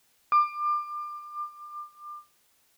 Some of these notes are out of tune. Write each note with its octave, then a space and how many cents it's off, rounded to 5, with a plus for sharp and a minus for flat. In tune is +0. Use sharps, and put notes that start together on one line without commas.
D6 +30